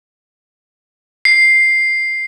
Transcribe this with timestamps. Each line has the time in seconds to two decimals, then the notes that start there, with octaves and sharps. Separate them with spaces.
1.25 C7